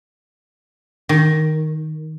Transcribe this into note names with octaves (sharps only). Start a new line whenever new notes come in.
D#3